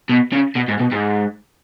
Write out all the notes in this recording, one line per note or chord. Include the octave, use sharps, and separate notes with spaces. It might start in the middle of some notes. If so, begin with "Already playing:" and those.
B2
C#3
B2
G#2
B2
G#2